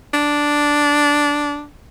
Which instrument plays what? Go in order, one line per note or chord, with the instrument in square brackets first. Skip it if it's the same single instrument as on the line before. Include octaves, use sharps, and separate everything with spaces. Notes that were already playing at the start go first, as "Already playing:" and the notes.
[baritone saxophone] D4